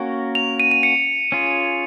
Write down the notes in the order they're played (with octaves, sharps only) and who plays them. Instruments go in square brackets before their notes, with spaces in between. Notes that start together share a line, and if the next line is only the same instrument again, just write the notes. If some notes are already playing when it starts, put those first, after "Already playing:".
Already playing: [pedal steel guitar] A#3 C#4 F#4 A#4
[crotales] F7
D#7
D#7
C#7
[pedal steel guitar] C#4 F4 G#4